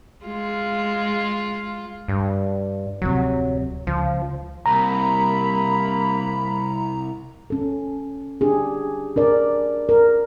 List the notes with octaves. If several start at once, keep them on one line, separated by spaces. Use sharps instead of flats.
G#3 F4
G2
D1 F2 C3 F#3
C#2 F3
C2 A#3 A#5 B5
C#4 A4
D4 G4 G#4
D4 A#4 D5
A#4